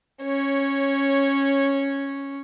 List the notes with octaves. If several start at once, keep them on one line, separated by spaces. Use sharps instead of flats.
C#4 C#5